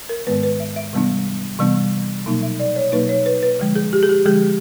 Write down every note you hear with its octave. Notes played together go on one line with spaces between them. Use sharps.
A#4
G#2 D#3 G#3 B3 B4
B4
E5
E5
C3 E3 G3 B3 D4
C3 E3 G3 B3 D4
B2 F#3 A#3 D#4
E5
D5
C#5
B2 F#3 A#3 D#4 B4
C#5
B4
B4
D3 F3 G#3
G#4
G4
G#4
G4
D3 F3 G#3 G#4